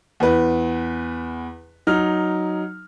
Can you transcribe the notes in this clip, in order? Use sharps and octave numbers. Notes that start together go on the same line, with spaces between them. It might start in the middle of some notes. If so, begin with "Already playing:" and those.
E2 B4
F#3 D#4 F6